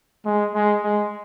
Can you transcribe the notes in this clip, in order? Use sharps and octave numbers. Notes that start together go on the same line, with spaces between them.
G#3
G#3
G#3